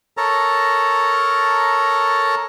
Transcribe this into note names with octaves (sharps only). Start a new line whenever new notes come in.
A4 A#4 C#5 A5 A#5